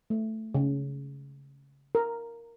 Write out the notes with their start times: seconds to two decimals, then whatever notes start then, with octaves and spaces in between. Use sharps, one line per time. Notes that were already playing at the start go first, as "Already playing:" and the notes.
0.10 A3
0.55 C#3
1.95 A#4